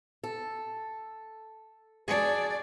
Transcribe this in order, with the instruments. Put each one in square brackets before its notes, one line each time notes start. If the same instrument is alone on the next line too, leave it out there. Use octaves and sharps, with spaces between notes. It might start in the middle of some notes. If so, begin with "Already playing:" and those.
[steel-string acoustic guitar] A4
[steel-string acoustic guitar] D4 F#4 G#4 [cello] D5